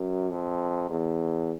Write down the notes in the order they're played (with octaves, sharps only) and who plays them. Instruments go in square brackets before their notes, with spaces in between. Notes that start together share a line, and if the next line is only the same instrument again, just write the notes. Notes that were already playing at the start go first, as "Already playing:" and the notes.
Already playing: [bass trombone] F#2
F2
E2